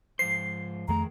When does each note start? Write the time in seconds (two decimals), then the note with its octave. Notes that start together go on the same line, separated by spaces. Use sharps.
0.19 G#2 F3 C5 C7
0.88 F2 D#3 A3 G#4 A#4 A#5